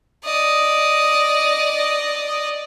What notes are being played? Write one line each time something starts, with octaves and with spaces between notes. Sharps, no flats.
D5 D#5